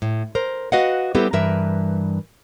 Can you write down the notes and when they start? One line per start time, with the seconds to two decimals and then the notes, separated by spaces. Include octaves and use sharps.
0.02 A2
0.35 A#4 C5
0.72 F#4 B4 D#5 F5 F#5
1.15 G3 B3 C4 E4 G4 A4
1.33 G2 E3 A#4 B4 E5